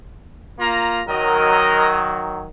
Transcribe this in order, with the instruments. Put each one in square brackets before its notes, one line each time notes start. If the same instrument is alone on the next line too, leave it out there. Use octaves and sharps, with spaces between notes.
[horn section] A#3 F4 A#5
[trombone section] D#3 F#3 [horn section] A#4 D#5